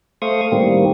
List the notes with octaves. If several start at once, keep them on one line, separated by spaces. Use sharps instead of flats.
A3 C5 F5 C#6 D#6
A2 D#3 G3 A#3 C4